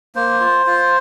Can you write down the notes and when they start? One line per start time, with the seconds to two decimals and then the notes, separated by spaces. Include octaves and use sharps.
0.15 A#3 C5
0.40 F4
0.66 F4